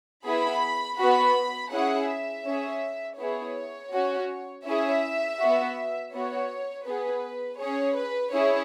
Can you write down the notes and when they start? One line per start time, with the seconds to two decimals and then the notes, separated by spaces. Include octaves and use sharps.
0.26 B3 E4 G#4 B5
0.99 B3 F#4 B5
1.72 C#4 E4 G#4 F#5
2.09 E5
2.46 C#4 G#4
3.19 B3 E4 G#4 C#5
3.93 C#4 F#4
4.66 C#4 E4 G#4 E5
5.40 B3 F#4
6.13 B3 F#4 C#5
6.86 B3 G#4 B4
7.59 C#4 G#4 C#5
7.97 B4
8.33 C#4 E4 G#4 C#5